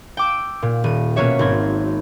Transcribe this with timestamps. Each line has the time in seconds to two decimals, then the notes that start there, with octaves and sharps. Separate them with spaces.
0.17 G5 D6 E6
0.62 A#2
0.84 D#1 D#7
1.16 B2 A#3 C#4 F#4 C#5 E5
1.39 G#1 C4 G#6